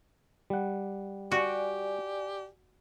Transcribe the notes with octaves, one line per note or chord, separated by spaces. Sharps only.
G3 F#5
F#4 G4 D5 G#5